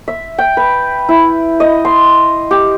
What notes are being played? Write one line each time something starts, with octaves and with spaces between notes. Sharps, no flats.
E5
G5
B4
E4
D#5
C6
G4